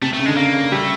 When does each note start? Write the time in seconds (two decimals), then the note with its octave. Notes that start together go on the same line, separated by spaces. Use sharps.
0.02 C3 A3
0.13 A3
0.19 C#3
0.26 D3 G#3
0.37 C#3 A#3
0.54 C#3
0.72 G3 A3